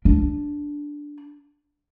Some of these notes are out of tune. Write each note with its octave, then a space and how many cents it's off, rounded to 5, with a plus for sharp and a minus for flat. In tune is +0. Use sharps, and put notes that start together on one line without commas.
D4 -5